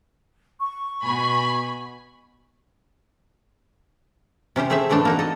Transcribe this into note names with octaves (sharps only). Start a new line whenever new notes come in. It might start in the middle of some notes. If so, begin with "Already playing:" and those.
C#6
B2 G#5 B5
C3 C#4 G4 C5
A3 C4 G#4 C5 E5
A2 E3 A3 C4 D4 A4
A#3 D#4 F#4
A4 D#5